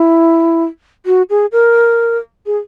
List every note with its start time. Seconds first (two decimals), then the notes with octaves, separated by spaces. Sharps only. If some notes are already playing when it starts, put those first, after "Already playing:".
Already playing: E4
1.06 F#4
1.30 G#4
1.52 A#4
2.46 G#4